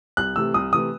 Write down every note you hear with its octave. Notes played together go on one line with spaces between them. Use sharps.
C2 F#6
C3 E3 A3 E6
C2 D#6
C3 E3 A3 D#6